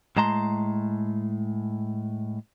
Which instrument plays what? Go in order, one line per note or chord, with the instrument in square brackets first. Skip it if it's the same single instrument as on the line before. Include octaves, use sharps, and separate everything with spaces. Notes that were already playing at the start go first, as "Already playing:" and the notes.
[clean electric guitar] A2 G#3 A5 A#5 C6